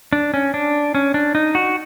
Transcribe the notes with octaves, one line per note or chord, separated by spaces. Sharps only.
D4
C#4
D4
C#4
D4
D#4
F#4